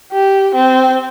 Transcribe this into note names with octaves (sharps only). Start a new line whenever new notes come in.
G4
C4